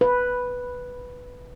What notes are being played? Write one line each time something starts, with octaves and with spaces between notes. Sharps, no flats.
B4